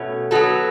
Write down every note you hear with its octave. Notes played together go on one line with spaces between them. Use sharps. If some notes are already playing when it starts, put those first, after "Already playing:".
Already playing: B2 A3 C#4
F#3 B3 F#4 A4